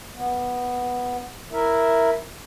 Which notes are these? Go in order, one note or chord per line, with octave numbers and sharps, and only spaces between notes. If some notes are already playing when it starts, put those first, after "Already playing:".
B3
E4 A#4 E5